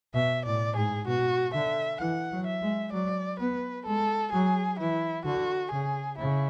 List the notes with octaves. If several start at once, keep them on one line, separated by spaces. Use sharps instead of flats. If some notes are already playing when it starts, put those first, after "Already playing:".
B2 E5
A2 D5
G#2 G#4
B2 F#4
D3 E5
E3 F#5
F#3
E5
G#3
F#3 D5
B3 B4
G#3 A4
F#3 G#4
E3 E4
D3 F#4
C#3 G#4
C#3 E4